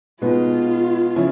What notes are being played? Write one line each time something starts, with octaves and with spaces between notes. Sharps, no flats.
B2 G#3 B3 D#4 F4
C#3 F3 C#4 E4